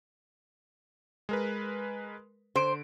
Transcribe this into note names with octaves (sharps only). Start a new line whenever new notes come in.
G#3 A#4 B4
D3 C5 D7